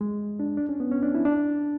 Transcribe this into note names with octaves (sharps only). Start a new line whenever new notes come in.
G#3
D4
D4
C#4
B3
C#4
D4
E4
D4